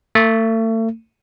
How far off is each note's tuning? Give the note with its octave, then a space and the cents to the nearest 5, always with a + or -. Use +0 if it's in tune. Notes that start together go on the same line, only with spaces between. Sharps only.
A3 +35